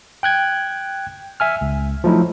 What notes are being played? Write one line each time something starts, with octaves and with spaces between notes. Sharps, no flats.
G5 F#6 G#6
E5 G#5 F6
C#2
F3 F#3 A3 D#4 E4